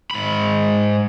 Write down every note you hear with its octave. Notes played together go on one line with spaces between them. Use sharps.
G#2 B5